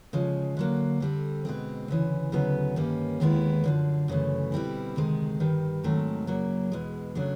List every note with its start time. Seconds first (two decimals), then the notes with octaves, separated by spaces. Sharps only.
0.13 C#3 F3 G#3
0.57 D3 F#3 A#3
1.00 D3 G3 C4
1.45 B2 G#3 C4
1.88 D2 C#3 E3
2.32 D2 C#3 F#3 B3
2.76 G2 D#3 G3 A#3 C#4
3.20 D#2 D#3 G#3 B3 E4
3.64 F#2 D3 F3
4.08 F#2 C#3 E3 A3
4.52 B2 G3 C4 E4
4.96 D2 C3 D#3 G#3
5.40 G2 D#3 G3
5.83 G#2 D#3 F#3 A3 C4
6.27 F#2 C#3 F#3 A#3
6.72 E2 B2 G#3
7.15 C#3 F#3 A3 D4